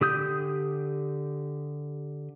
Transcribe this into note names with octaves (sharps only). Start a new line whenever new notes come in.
D3 G4 D#6 G6